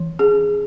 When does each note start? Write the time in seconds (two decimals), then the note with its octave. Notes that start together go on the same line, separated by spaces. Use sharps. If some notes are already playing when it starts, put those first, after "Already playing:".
Already playing: E3
0.19 C#4 G#4